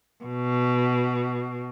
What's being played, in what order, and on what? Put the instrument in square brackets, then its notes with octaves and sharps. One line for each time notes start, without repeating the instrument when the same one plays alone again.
[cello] B2